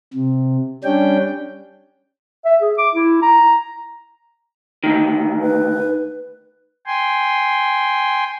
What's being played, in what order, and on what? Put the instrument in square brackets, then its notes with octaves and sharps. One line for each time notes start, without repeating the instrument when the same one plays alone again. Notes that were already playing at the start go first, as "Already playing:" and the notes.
[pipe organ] C3
G3 C#4 D4 G5
[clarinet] E5
G#4
D6
E4
A#5
[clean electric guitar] D2 D#3
[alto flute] B4
[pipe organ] G5 G#5 C6